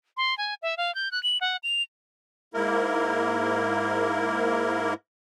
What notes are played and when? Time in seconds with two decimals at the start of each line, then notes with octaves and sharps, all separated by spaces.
0.17 C6
0.38 G#5
0.62 E5
0.77 F5
0.95 G6
1.11 F#6
1.23 F#7
1.41 F#5
1.63 F7
2.54 G#2 A#3 E4 A#4